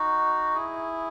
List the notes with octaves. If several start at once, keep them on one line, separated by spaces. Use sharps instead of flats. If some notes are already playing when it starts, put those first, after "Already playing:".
Already playing: D#4 F#4
E4 G#4